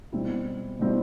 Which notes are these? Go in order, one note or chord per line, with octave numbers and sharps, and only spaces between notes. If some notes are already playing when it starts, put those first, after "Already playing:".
B2 G3 C4 E4
B2 G3 C4 E4